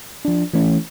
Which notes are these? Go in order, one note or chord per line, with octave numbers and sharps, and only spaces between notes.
F3 D4
E3 A3 C#4